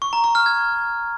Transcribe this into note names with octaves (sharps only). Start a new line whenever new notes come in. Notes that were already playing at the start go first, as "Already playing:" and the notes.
C#6
A#5
C#6
F6
G#6